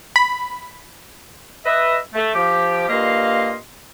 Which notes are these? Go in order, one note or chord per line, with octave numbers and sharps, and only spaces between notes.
B5
B4 D#5 E5
A3
F3 G4
G2 A#2 A#3 D#5 F5 C6